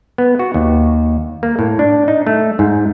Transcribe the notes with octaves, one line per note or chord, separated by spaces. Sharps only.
B3
F#4
D#2
A#3
A2
D4
D#4
A3
G#2